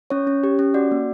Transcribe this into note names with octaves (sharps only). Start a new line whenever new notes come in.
C#4 C#5
C#4
G4
C#4
F#4 D5
A#3